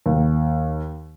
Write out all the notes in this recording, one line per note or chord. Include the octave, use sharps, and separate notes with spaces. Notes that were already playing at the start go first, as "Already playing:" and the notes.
D#2